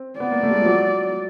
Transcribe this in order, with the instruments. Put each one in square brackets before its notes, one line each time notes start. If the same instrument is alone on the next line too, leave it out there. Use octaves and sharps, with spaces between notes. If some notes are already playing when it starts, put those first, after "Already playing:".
Already playing: [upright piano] C4
[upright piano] B3 [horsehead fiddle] D5
[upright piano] A#3
A3
G3
G#3
F3
F#3